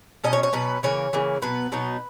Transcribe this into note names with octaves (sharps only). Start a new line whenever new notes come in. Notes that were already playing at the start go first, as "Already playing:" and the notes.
B2 F#3 C#4 D#5
C#5
C#5
B2 F#3 C#4 B4
C#3 E3 A#3 C#5
C#3 E3 A#3
B2 F#3 B3 B4
B2 F#3 B3 D#4